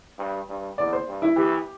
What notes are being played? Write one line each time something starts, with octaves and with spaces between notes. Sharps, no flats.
G2
G2
E2 D5
C5
G2
E4
E3 G4